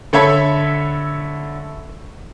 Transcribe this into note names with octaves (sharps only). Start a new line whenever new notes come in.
D3 A4 C#5 E5 B5 G#6